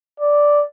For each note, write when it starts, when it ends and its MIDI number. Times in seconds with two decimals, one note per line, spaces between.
0.20 0.64 74